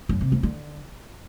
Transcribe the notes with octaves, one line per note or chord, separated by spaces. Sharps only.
F#2
C3
F2
D3